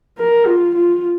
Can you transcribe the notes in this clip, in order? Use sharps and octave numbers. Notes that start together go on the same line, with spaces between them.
A#4
F4
F4